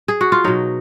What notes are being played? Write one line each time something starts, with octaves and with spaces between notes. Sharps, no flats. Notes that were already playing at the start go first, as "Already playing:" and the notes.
G#4
F#4
F4
B2 F#3 D#4